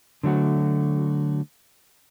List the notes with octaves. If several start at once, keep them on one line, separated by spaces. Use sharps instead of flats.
D3 F#3 A3 F#4